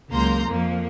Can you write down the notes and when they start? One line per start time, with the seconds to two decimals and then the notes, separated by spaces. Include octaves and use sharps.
0.11 C#2 F#3 A#3 A#5 C6 G6
0.49 F2 F3 A#3